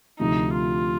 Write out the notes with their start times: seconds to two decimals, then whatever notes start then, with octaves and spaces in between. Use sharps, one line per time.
0.19 D2 C3 F3 D#4
0.54 F4